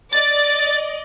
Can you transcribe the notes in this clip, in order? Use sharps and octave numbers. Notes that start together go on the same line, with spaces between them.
D5 D#5 A6